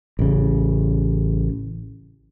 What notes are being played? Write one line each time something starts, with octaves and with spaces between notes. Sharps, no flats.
A1 C#3